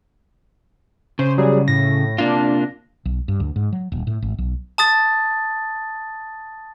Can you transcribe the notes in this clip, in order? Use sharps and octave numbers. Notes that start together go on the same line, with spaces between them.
C#3 C5
F#3 G3 G#4
A2 A#6
C3 A#3 D4 F4
B1
G2
D2
G#2
F#3
D#1
A2
G#1
B1
A5 D#6 A6